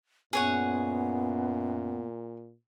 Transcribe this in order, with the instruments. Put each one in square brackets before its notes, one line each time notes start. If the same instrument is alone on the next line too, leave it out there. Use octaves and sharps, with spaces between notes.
[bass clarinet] F#2 [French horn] A#2 [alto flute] B3 [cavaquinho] G#4 C#5 F#5